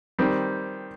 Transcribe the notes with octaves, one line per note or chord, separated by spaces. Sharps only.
D#3 G3 C4